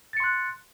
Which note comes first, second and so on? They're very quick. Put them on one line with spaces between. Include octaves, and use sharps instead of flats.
A6 C#7 C6 F#6